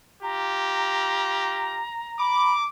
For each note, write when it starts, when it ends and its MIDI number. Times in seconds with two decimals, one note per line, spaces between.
0.23 1.82 65
0.23 1.82 67
0.23 2.62 82
2.19 2.53 83
2.19 2.69 86